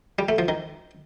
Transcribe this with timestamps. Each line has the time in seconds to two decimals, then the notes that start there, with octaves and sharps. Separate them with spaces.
0.19 G3
0.29 A3
0.38 F3
0.48 D#3